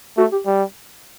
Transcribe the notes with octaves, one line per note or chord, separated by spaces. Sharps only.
A3 F#4
G4
G3